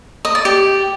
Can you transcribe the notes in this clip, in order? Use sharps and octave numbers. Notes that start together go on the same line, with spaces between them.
D#5
D5
G4